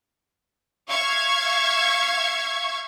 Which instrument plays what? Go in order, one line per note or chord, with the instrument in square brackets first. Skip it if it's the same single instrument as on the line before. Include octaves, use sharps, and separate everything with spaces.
[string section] E5 F5 C#6 G#6